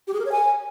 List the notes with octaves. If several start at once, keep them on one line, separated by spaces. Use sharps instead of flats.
G4
G#4
A#4
C#5
G#5